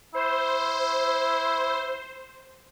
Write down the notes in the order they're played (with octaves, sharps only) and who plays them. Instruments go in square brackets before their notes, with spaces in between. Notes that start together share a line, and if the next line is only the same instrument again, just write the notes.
[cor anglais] E4 [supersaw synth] C5